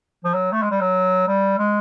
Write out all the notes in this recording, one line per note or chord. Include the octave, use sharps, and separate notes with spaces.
F3
F#3
A3
G#3
G3
F#3
G3
G#3